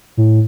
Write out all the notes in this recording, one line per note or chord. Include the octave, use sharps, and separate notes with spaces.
A2